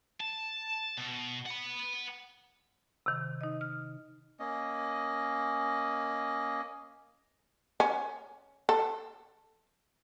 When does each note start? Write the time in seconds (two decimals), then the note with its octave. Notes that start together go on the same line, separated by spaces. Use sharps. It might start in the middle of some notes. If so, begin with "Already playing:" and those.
0.20 A5
0.97 B2
1.46 F#5 B5
3.06 C3 D#3
3.41 D#4 D#5
3.61 F6
4.39 A#3 C#4 D#5
7.80 C#4
8.69 A4